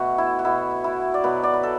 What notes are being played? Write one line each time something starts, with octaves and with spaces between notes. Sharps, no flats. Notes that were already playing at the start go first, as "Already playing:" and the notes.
Already playing: B2 A3 F#4 E5
E4
F#4
B2 B3 E4
E4
D5
B2 F#3 B3 B4
D5
B4
A4